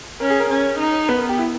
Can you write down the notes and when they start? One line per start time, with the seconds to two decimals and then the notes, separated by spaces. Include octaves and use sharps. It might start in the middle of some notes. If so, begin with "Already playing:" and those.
0.20 C#4 A#4
0.30 G#4
0.40 A#4
0.50 C#4
0.79 D#4
1.09 B3 B4
1.18 A#4
1.29 G4
1.38 E4